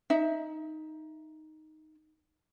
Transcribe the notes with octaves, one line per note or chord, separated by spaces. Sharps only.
D#4 E5